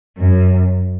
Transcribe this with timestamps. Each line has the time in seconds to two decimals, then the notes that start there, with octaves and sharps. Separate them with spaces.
0.18 F#2